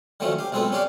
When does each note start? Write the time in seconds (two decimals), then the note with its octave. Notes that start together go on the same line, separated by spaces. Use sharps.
0.20 D3 D#3 F3 F#3 A3 C#4
0.39 G4 F5
0.52 B1 G#3 C4 F4 A4 B4
0.72 C#4 D4 G4 C#5 D5 F5